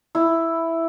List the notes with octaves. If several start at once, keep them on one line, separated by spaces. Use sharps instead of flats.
E4